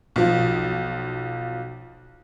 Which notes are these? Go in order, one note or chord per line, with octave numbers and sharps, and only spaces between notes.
B1 F3